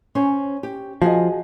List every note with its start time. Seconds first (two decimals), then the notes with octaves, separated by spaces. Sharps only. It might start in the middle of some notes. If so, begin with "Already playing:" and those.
0.15 C#4 C5 C#5
0.63 G4
1.02 F3 F#4 G#4 D#5